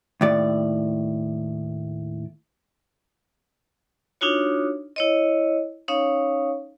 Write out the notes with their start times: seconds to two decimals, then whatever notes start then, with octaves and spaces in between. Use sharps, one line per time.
0.21 D#2 A2 D5
4.21 D4 D#4 F4 F#4 C#5
4.96 E4 C#5 D#5
5.88 C#4 D#4 C#5 F5